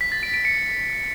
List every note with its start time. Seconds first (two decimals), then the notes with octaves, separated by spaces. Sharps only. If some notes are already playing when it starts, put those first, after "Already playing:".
0.01 B6
0.12 A6
0.23 D7
0.34 D7
0.45 C#7